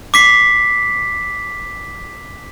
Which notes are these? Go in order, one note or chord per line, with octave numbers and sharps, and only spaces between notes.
D6 B6 C7